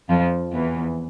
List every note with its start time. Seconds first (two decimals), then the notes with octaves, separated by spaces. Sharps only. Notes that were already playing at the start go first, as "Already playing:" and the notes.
0.09 F2 F3
0.53 E2 E3